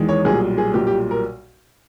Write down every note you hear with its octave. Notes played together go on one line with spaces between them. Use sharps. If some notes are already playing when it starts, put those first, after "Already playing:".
Already playing: E2 D#3 G#3
C#5
B1 A#2 G3 G#4
G#4
B1 A#2 G3 G4
G4
A#4